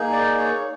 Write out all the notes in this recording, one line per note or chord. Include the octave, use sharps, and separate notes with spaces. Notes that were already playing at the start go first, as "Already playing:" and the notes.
Already playing: A#3 D#4 G#4
D5
C#5